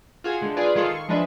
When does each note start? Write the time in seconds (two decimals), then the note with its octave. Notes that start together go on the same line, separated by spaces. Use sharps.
0.24 F4 F#4 G#4 G#5
0.41 D3 G#3
0.57 F4 G#4 B4 D5
0.75 D#3 G#3 F4 G#4 A4 C7
0.91 C#6
1.08 F3 G#3 D4 B4 E5